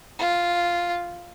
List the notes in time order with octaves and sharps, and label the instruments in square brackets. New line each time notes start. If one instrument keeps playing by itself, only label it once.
[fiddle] F4